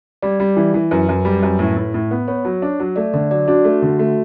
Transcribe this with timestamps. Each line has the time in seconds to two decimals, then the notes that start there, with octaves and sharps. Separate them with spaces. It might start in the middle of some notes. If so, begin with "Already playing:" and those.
0.23 G3 D5
0.40 G3
0.57 E3
0.74 E3
0.91 F#2 B4
1.09 F#2
1.25 G3
1.43 F#2
1.59 A2
1.77 A2
1.94 A2
2.11 B3
2.28 B3 C#5
2.45 F#3
2.62 D4
2.80 F#3
2.96 A3 D5
3.14 D3 D5
3.31 F#3 D5
3.48 D4 F#4
3.65 A3
3.82 D3
3.99 A3